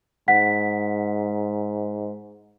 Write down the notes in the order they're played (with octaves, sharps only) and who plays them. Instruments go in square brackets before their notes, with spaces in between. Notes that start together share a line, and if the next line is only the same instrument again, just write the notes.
[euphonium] G#2 [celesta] F#5 B6